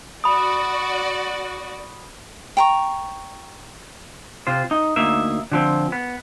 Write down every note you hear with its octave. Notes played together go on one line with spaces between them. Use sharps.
F#4 D5 B5 D#6
G5 A#5 C#6
C3 F4 C5
D#4
D2 A#3 D#4 E5
D3 F3 C4
B3